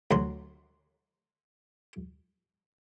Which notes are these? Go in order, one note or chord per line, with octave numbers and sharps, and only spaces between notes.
D2 F#3 C6